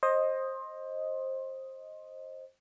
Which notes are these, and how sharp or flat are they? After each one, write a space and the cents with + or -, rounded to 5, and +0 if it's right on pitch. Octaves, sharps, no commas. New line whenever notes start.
C5 +20 D#5 +0